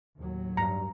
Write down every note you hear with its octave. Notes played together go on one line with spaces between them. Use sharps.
D#2 A2 F#3
G2 A#5